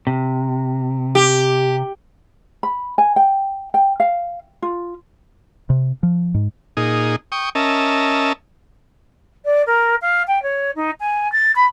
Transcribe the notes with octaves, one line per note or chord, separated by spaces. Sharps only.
C3
G4
B5
G#5
G5
G5
F5
F4
C3
F3
G#2
A#2 D#4 G#4
G5 C#6 D#6
C#4 A#4 D#5 E5 A5
D5
A#4
F5
G5
C#5
D#4
G#5
A6
B5